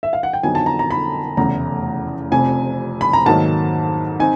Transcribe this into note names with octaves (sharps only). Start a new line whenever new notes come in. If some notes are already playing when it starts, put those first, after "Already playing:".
E5
F5
F#5
G5
F2 D3 F#3 B3 D#4 G#5
A5
A#5
A#5
B5
F1 E2 C#3 E3 A3 A#5
F1 F2 C3 G#5
B5
A#5
G#2 D#3 F#3 A#3 D#4 A5
C4 D#4 G#5